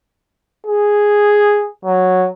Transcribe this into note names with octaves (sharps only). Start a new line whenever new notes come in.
G#4
F#3